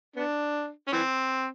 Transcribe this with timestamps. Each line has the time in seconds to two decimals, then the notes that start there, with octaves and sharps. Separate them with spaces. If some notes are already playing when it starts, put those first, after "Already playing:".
0.16 B3 D4
0.88 C#4
0.93 E3 C4